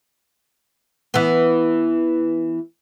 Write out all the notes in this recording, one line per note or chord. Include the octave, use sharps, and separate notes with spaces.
E3 B3